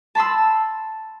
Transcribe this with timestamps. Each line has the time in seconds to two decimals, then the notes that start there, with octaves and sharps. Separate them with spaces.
0.15 A5 B5 C6 E6